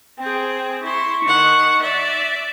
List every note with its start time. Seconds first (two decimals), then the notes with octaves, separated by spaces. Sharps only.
0.18 C4 G#4 G5
0.82 E4 C6 C#6
1.23 D#3 F#5
1.81 D5 E5